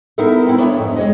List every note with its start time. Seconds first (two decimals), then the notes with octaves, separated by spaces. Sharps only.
0.18 B3 D#4 E4 A4 A#4 E5
0.46 C4 E4
0.58 B3 C#4 D4 C#5 D5 E5
0.74 F2 G#2
0.96 G#3 C#5 D#5